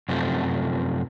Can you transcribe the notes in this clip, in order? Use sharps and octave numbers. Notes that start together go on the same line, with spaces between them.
F#2 C3 F3 A3